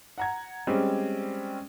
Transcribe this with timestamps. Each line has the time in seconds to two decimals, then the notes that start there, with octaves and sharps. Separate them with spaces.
0.18 F#5 A#5 G#6
0.67 G3 G#3 C4 C#4